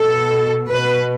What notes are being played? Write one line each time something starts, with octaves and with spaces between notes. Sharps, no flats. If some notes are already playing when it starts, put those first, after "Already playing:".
Already playing: B2 A4
B2 B4